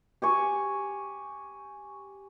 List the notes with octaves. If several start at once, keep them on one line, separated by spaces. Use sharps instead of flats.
G4 G#5 C#6